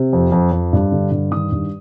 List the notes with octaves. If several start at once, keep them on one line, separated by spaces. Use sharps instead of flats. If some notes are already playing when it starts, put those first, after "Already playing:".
Already playing: C3
F2
F2
F2
G2
D3
G2
D#3 D#6
G2